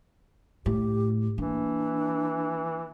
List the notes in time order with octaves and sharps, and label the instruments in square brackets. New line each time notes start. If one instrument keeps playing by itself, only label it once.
[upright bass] A2 [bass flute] G4
[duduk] E3 [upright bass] A#3 [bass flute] D4